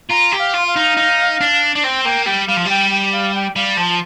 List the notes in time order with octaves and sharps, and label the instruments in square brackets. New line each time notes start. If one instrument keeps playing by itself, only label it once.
[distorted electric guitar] F4 [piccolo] A#5
[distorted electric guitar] G4
[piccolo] F5
[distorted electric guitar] F4
[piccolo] F5
[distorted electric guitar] D#4
D#4
D4
D4
[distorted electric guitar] C4 [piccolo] G5
[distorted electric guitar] A#3 [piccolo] G5
[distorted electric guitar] G3 [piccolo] G5
[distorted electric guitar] G3 [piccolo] F5
[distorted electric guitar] F3
[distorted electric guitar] G3 [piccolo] G5
[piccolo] G5
F5
G5
[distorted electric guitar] G3 [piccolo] F5
[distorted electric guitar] F3 [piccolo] A5